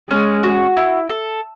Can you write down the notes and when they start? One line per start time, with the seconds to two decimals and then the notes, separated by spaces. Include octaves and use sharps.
0.10 G#3 C#4
0.43 F#4
0.77 E4
1.09 A4